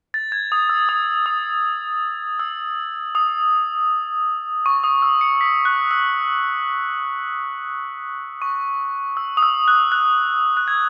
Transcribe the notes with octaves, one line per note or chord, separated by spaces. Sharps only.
A6
G#6
D#6
E6
D#6
D#6
E6
D#6
C#6
D#6
E6
C#7
B6
F#6
E6
C#6
E6
D#6
E6
F#6
F#6
F#6
G#6